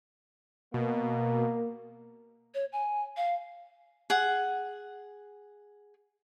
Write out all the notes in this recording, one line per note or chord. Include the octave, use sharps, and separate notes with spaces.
B2 A#3
C#5
G#5
F5
G#4 F#5